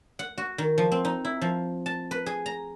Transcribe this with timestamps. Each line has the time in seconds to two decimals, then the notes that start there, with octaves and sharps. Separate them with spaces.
0.19 F#5
0.38 F#4
0.58 D#3
0.78 F3
0.92 C4
1.05 D#4
1.25 E4
1.42 F3
1.86 A5
2.11 B4
2.26 G#4
2.46 A#5